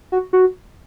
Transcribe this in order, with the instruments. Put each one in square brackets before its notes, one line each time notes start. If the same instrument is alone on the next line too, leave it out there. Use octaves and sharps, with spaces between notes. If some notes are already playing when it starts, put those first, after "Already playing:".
[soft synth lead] F#4
F#4